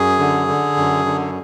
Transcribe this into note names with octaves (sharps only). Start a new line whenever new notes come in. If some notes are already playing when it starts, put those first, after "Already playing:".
Already playing: F#2 G#4
D3
D3
F#2
D3